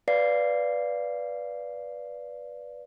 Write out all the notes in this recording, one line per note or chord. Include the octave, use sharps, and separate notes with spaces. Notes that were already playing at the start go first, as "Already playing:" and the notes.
B4 D5 F5 C7